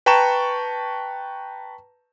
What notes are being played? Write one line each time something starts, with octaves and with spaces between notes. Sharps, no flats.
B4 G5 A5 A#5 C#6 E7